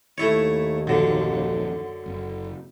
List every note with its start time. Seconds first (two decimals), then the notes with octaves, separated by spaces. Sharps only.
0.18 D#2 A3 E4 C#5
0.87 A#1 F#2 D3 D#3 F3
2.06 F#1